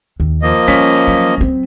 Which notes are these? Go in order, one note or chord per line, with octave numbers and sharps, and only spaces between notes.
D#2
F3 A#3 D#5
G3 C#4 B6
F#3
F#3 C4